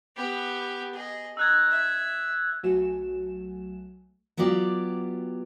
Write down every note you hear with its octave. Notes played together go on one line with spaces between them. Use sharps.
B3 G4
G#4 D#5
D#4 E6 F#6 G#6
E5
B1 F#3 A3 F#4 G#5 E7
F#3 B3 F4 G4 D5